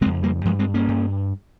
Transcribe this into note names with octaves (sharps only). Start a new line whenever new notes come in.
F2 C#3 G#3 C4
G3 A#3
G2 F3 G#3
G#3 C4
A#3 C#4
G2